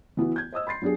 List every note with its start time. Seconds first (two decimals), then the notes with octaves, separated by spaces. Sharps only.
0.17 E3 B3 E4 F#4
0.36 G6 G#6
0.52 C5 D#5 D#6 E6
0.67 B5 C6 A6 C7
0.82 F#3 B3 D4 G4 G#4